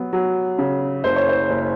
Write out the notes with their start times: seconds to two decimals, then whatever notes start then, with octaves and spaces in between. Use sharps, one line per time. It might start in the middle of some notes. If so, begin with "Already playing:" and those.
Already playing: F#3 B3
0.13 F#3
0.58 C#3
1.04 F#1 C5
1.16 C#5
1.29 C5
1.50 F#1